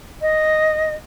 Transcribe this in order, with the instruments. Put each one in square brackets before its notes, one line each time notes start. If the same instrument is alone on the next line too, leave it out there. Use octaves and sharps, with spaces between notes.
[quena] D#5